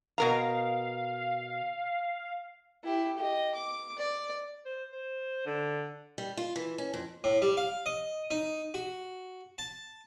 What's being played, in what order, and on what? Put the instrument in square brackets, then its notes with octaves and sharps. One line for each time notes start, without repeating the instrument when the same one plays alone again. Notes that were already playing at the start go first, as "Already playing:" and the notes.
[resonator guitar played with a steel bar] B2 A#4 A#5 [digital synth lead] F5
[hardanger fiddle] E4 G4
G4 D#5
D6
D5
[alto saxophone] C5
C5
D3
[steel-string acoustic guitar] G3
F4
E3
C#4
F2
[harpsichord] A2
G3
F5
D#5
D#4
F#4
A5